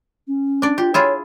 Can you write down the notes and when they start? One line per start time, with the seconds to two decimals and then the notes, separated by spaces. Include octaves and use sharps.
0.28 C#4
0.62 D4 D5
0.78 F4 G4
0.94 E4 F4 G#4 C#5